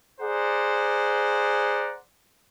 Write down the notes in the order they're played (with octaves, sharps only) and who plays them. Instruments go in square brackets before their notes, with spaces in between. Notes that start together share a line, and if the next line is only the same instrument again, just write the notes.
[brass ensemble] G#4 C5 D5 F#5 A#5